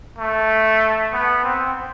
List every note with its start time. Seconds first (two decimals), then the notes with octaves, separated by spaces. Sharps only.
0.18 A3
1.13 B3
1.44 C4